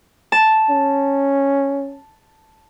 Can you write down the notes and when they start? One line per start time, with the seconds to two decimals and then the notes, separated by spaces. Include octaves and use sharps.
0.32 A5
0.70 C#4